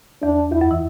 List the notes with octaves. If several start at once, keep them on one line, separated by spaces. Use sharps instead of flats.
E2 D4
E2 E4
F#2
E3